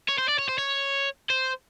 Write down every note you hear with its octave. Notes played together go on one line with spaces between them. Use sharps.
C#5
C5
D5
C#5
C5
C#5
C5